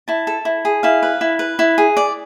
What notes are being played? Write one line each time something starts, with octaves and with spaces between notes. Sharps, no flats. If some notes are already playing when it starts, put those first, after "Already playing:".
E4 A5
A4
E4
G#4
E4 F5
B4
E4
B4
E4
G#4
D5